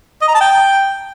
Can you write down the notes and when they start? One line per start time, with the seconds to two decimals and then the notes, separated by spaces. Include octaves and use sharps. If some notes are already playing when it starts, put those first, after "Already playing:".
0.22 D#5
0.28 A#5
0.35 A5
0.41 G5